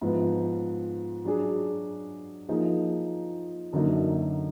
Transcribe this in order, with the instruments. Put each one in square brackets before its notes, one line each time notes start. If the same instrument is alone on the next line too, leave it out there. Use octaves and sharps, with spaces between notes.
[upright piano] G#2 F3 B3
F#3 D4 G#4
F3 A#3 D#4 G#4
F#2 D3 F#3 A#3 D#4